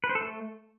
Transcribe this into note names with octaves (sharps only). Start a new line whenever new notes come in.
B4
C5
A4
A3